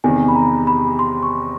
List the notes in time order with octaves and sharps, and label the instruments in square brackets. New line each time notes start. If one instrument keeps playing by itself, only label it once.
[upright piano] E2 C3 D#3 [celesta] G#5
[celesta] B5
A#5
B5
C6
C#6